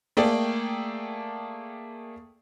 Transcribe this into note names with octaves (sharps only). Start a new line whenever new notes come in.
A3 A#3 G#4 A4 D5 G5